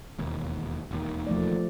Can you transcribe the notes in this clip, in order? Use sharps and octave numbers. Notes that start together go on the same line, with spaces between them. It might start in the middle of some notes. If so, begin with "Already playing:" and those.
E1 D#2
E1 D#2 D#3
F3 A3 D5